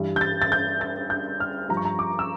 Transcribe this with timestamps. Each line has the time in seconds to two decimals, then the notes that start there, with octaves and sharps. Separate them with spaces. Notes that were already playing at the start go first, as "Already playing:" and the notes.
Already playing: G2 E3 G3
0.16 G6
0.21 A6
0.42 A6
0.52 G6
0.81 A6
1.10 G6
1.40 F6
1.69 G2 F3 A#5
1.77 C#6
1.85 A#5
1.99 D6
2.19 E6